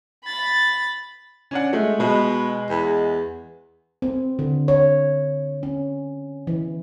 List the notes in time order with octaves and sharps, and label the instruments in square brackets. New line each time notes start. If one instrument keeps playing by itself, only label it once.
[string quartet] B5 A6
[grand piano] C#4 D4 F#5
G#3 A3
[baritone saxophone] B2 [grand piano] G#3 B4
[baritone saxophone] E2
[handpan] C4
D3
C#5
C#4
E3